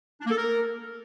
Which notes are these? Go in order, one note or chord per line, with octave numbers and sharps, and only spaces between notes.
D4
A#3
A4
A#4